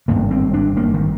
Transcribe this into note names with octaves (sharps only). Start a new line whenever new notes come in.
G#1 G2 D3 A#3
C4
D4
A#3
D#3